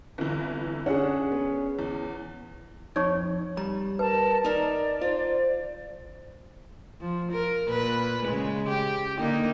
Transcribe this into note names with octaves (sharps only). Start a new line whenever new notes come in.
G1 C3 E3
D3 C#4 D4 G#4 F#5
B3
E2
F2 D#4 C#5 C#6
G3 A#5
A#4 B4 A5
D#4 A#4 D5
F4 C5
F3
A#4
A#2 B4
C#3 G#3
G4
D3 A#3 D#4